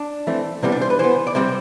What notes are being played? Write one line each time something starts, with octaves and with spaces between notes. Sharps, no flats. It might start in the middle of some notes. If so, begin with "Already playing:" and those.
Already playing: D4
E3 A3 C4
C3 E3 G3 B3 C4
D4
C5
B4
E3 B3 C5
D5
C3 G3 C4 C5